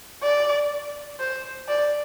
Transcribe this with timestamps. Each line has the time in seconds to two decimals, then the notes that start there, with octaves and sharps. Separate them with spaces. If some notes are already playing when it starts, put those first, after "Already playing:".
0.23 D5
1.20 C5
1.68 D5